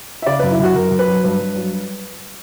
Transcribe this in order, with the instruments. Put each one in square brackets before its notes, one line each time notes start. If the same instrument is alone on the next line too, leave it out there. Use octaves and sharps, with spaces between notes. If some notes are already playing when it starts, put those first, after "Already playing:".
[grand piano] E5
C#3 D5
F#2 B4
E4
F#2 F#4
F#2 A#4
F#2
B4
F#3
G2 B4
G2
F#3